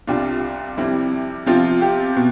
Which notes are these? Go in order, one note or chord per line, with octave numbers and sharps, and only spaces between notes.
C2 C3 G3 D4 F4
F2 C3 G3 C4 E4
C3 F3 C4 F4
G4
B2